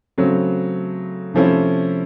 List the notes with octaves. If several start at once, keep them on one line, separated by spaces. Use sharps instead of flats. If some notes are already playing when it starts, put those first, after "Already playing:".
C#3 F#3 A3 C4
C3 F3 A3 C#4 E4